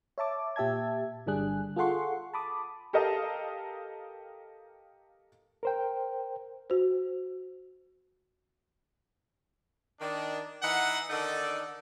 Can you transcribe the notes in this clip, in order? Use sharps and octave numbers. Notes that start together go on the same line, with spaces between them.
C#5 E5 A5 D6
A#2 G4 E5 A5 G#6
G1 D3 G3 D4 G#4 F#6
F4 G#4 A4 F#5 C6 C#6
A5 B5 D6 D#6
G4 A4 A#4 D#5 F5 A5
A#4 C5 G5
F#4 C5
D#3 D4
E3 D#4 F#5
D3 D#3 D#4 A4 D5